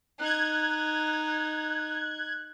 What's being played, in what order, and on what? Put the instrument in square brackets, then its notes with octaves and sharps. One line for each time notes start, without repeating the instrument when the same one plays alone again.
[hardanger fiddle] D#4 [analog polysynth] F#6 G#6